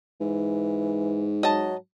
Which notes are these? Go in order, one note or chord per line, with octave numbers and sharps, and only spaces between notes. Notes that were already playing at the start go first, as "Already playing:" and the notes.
G#2 E3
F#3 D#5 A5